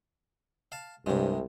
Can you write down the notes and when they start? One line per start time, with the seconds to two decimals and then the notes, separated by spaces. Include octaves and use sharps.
0.72 F5 A5
1.06 C2 G2 C3 G#3